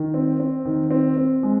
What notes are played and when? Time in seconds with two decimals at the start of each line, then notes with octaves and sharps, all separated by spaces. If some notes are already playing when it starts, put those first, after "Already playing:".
Already playing: D#3
0.14 C4
0.40 C4
0.65 D#3
0.91 C4
1.17 C4
1.43 G#3